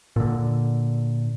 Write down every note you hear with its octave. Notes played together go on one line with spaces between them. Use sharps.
A#2 D3